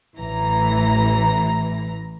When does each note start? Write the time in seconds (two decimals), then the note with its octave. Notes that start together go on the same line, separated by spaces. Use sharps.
0.18 A1 E3 A#5